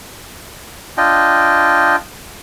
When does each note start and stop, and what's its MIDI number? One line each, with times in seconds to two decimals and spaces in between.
0.97 1.96 62
0.97 1.96 65
0.97 1.96 75
0.97 1.96 79